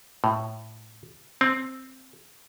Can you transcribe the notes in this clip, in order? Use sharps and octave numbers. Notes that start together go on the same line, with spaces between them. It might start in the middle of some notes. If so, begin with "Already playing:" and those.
A2
C4